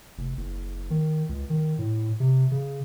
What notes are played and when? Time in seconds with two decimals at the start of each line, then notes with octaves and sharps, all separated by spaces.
0.18 F1
0.37 F#1
0.91 D#3
1.29 C#2
1.50 D#3
1.79 A2
2.20 C3
2.51 C#3